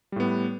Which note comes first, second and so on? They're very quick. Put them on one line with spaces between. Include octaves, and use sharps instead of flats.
G3 A2 B3